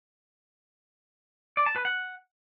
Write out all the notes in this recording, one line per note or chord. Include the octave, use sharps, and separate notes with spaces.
D5
A5
B4
F#5